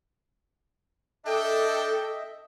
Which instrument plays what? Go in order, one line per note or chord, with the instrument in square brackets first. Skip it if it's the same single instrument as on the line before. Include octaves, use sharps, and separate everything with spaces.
[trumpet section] D4 G5 [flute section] A4 [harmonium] D#5 E5